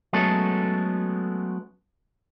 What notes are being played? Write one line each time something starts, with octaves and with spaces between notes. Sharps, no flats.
F#3 G#3 A3 B3 C#4 A4